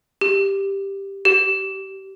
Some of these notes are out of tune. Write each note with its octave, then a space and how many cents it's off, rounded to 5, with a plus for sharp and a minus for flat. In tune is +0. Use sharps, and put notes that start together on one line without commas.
G4 +5
G4 -25